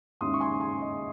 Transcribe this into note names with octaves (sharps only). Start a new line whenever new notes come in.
D#2 C#3 G#3 C#4 E4 C6 D#6
C#6
G#5 C6
G#5 C6
D#5